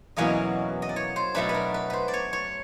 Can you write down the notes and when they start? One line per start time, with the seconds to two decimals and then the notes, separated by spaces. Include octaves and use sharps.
0.16 E2 B2 F#3 A#3 C#4 D#5
0.82 D#5
0.89 D5
0.96 C#5
1.16 C5
1.35 B2 F#3 A3 D4 B4
1.49 B4
1.54 A#4
1.74 B4
1.90 B4 C5
2.08 D5
2.14 C#5
2.33 C#5